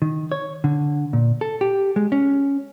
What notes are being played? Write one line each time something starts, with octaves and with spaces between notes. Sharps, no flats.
D#3
C#5
D3
A#2
A4
G4
G#3
C#4